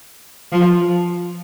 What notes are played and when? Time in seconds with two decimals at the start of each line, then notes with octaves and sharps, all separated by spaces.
0.52 F3